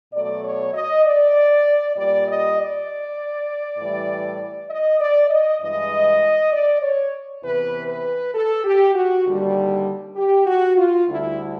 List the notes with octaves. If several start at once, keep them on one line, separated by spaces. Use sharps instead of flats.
B2 F#3 A3 D5
C#5
D#5
D5
A#2 G3 D5
D#5
D5
A2 E3 G3
D#5
D5
D#5
G2 E3 G#3 D#5
D5
C#5
E2 C3 E3 B4
B4
A4
G4
F#4
D#2 D3 G3
G4
F#4
F4
D2 D3 G3 E4